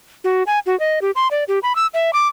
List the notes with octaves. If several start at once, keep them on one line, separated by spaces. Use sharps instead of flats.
F#4
G#5
F#4
D#5
G4
C6
D5
G4
B5
E6
E5
D6